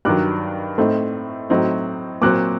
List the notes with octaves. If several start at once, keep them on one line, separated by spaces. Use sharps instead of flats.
G2 D#3 F#3 D6 F#6
A2 A3 C4 D#4
A2 F#3 C4 D#4
A#2 F#3 C4 D6 F#6